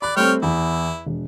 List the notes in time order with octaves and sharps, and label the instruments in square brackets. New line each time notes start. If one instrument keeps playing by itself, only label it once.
[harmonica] D5 [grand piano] B5 F#6
[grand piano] G3 A3 C4 [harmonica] C#5 G5 F6
[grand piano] E2 [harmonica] E4
[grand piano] E1